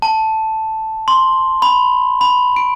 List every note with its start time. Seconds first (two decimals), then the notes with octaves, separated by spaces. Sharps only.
0.02 A5
1.08 C6
1.62 B5
2.21 B5
2.56 D7